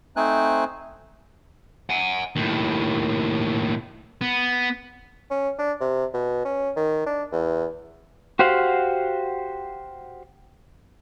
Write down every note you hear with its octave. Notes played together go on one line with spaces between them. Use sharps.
A3 C4 D#4 C5 G#5 F#6
F#5 G#5
D#2 A2
B3
C#4
D4
C3
B2
C#4
D#3
D4
E2
F#4 G4 C5 F5 F#5